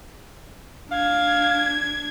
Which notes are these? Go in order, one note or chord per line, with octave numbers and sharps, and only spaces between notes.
D4 F5 G#6